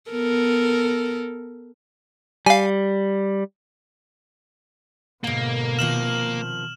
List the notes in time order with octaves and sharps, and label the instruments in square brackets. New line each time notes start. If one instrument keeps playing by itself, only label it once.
[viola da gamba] B3 A4 A#4
[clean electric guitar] G3 [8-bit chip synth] F5 G#5
[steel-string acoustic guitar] G#2 D3 [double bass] B2 [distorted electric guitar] A#3
[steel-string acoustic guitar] C3 D#3 F3 [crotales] F6 E7 F#7